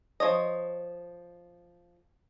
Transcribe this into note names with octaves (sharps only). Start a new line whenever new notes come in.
F3 C#5 D#5